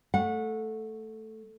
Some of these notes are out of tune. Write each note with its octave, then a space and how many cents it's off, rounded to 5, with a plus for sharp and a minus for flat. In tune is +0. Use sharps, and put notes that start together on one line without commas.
A3 +0 F#5 -25